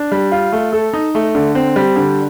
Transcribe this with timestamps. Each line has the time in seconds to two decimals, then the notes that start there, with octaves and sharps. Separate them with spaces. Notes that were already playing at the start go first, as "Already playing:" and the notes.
Already playing: D4
0.12 G3
0.32 F4
0.52 A3
0.73 A4
0.94 D#4
1.15 A3
1.35 D3
1.55 C4
1.76 G3
1.96 D3